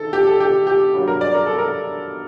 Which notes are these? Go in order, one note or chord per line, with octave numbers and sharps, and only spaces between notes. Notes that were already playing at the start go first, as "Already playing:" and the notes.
Already playing: D#3 A4
G4
A4
G4
G4
G2 F#3 A#3
A#4
D5
A#4
A4
A#4